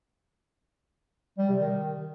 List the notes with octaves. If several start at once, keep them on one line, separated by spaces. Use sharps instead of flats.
G3
C3
D#3